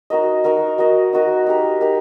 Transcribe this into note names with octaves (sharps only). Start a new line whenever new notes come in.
D#4 F#4 A#4 D#5
D#4 F#4 A#4 D#5
D#4 F#4 A#4 D#5
D#4 F#4 A#4 D#5
D#4 G4 A#4
D#4 G4 A#4